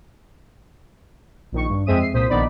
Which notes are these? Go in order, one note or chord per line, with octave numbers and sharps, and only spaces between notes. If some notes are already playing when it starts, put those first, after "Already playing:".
A#1 D#3 C#6
G2
F2 G#3 C4 E5 D#6 D#7
C7
C2 A#2 C5 D#6 B6
A#1 D#3 B3 D#4 D5 B5